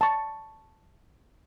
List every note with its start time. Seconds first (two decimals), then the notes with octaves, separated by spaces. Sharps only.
0.01 A5 C#6